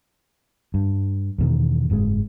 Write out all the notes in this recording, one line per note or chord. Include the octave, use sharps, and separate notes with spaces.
G2
E2 B2 D#3
F#1 G#2 B2 G#3